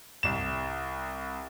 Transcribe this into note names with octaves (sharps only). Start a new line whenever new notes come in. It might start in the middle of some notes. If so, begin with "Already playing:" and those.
C2 E7